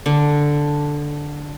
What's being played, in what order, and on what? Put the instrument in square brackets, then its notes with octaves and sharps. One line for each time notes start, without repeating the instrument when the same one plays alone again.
[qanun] D3